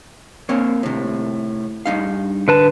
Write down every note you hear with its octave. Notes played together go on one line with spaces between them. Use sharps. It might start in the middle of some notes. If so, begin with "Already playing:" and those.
A#3 C4 C#5
A2 C3
G2 D#4 F5
D3 B4 A5